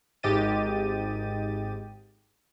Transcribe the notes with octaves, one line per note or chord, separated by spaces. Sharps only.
G#1 G#2 G4 D#5 A6 D#7